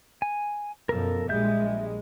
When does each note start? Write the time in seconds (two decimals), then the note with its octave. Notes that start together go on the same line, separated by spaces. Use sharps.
0.22 G#5
0.89 F#2 B2 F3 A4 A#4
1.29 A#1 G3 G#3 E5 G6